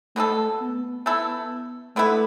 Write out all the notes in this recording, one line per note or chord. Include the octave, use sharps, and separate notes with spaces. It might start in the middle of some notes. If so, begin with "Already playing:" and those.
B2 A3 B3 D4 A4
B3
A3 E4 A4
D3 A3 B3 E4 B4